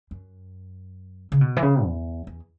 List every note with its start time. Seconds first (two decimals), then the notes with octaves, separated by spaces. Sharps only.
0.11 F#2
1.32 C#3
1.41 B2
1.57 E3
1.62 C#3
1.85 E2
2.27 E2